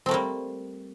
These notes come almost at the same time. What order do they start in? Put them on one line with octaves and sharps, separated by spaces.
C4 A3 A#3 G3